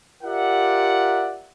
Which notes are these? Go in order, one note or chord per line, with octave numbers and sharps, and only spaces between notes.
F4 G4 A#4 D5 E5 F#5